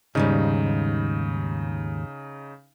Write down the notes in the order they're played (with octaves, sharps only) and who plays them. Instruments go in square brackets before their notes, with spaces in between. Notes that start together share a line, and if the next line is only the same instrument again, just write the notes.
[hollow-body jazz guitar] D#2 G#2 G3 [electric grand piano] C#3 D#4